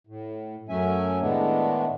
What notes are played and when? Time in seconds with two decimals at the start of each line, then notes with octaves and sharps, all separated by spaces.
0.07 A2
0.69 F#2 F#3 A3 C#4 E5 G#5
1.21 A2 D#3 G#3 A3 B3 D4